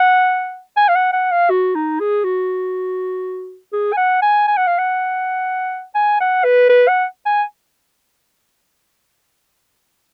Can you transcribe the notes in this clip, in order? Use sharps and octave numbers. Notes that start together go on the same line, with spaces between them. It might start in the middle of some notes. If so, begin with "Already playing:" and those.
Already playing: F#5
G#5
F5
F#5
F#5
F5
F#4
D#4
G#4
F#4
G#4
G#5
F#5
G#5
G#5
F#5
F5
F#5
G#5
F#5
B4
B4
F#5
G#5